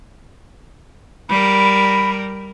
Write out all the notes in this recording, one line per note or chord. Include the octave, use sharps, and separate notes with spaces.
G3 A#4 B5